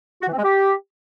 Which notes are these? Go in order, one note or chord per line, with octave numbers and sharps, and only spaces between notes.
F#4
E3
C4
G#3
G4